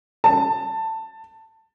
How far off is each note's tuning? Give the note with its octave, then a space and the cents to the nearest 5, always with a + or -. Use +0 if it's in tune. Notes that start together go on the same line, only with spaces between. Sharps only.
A5 +15